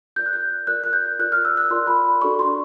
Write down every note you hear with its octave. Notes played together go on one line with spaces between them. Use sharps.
F4 A#4 D5 G6
F#6
G6
F4 A#4 D5 F#6
F#6
G6
F4 A#4 D5 F#6
F6
E6
F#6
F4 A#4 D5 C6
B5
D4 F#4 A4 D5 C#6
C6